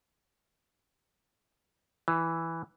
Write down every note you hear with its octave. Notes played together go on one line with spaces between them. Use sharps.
E3